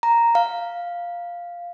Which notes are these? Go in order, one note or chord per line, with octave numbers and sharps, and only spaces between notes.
A#5
F5